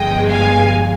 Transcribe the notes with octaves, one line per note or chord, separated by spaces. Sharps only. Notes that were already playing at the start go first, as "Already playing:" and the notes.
Already playing: G1 G2 F3 G#3 D#5 G5
F5 G#5